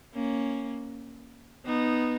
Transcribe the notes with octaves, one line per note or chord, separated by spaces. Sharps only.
A#3 C#4
B3 D#4